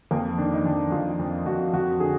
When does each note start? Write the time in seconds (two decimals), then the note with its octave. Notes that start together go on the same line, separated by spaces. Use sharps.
0.11 F2 A#3
0.38 D#3 D4
0.54 D#4
0.65 F2 D4
0.92 F2 F4
1.19 F2
1.46 F2 F#4
1.73 F2 F#4
2.00 D3 G#4